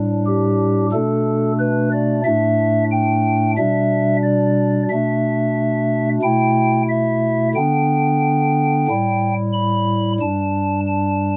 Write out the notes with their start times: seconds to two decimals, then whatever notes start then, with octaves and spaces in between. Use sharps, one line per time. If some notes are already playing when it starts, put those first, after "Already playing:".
Already playing: A2 G3 D4
0.26 G4
0.92 B2 A3 D4 A4
1.59 B4
1.92 D5
2.25 A2 A3 D4 E5
2.91 G5
3.57 B2 G3 D4 E5
4.23 D5
4.90 B2 A3 D4 E5
6.22 B2 A3 E4 G5
6.89 E5
7.55 D3 B3 D4 G5
8.88 A2 G3 E4
9.53 B5
10.20 G2 G3 D4 A5
10.87 A5